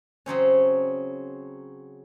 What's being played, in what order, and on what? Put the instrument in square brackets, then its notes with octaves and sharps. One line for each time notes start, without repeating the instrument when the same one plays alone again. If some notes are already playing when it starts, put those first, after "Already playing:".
[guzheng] C#3 F#3 C4 C#4